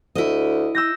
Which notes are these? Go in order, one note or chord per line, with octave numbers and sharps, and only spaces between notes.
D2 E4 D#5
E6 G6 A#6